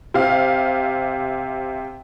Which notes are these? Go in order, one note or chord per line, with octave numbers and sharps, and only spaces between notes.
C3 F5